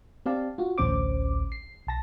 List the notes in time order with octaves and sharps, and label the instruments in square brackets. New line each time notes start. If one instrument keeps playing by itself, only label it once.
[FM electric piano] C4 G4 D5 F5 A5
F4 F#4
A1 D2 C#4 C5 D6
C7
B1 A5 A#6